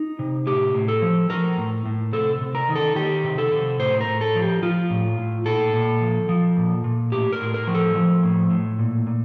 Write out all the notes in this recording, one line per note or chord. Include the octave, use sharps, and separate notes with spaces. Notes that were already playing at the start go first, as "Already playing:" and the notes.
Already playing: D#4
C3
A2 G4
A2
A4
F3
F3 A#4
A2
A2
C3 A4
C3
A#4
D#3
A4
D#3 G4
C3
A4
C3
A2 C5
A#4
A2
A4
F3
G4
F3 F4
A2
A2
A#2 A4
A#2
F3
F3
A#2
A#2
A2 G4
A#4
A2
A#4
F3
A4
F3
A2
A2
A#2
A#2